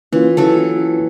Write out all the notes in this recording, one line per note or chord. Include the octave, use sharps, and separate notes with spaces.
E3 A#3 C#4 F4
E3 F#3 A4